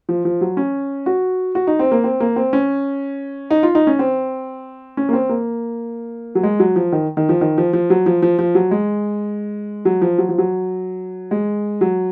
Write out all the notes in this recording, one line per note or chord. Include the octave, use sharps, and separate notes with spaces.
F3
F3
F#3
C#4
F#4
F#4
D#4
C4
A#3
C4
A#3
C4
C#4
D#4
F4
D#4
C#4
C4
C#4
A#3
C4
A#3
F#3
G#3
F#3
F3
D#3
D#3
F3
D#3
F3
F3
F#3
F3
F3
F3
F#3
G#3
F#3
F3
F#3
F3
F#3
G#3
F#3